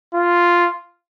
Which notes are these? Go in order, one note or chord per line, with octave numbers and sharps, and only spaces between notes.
F4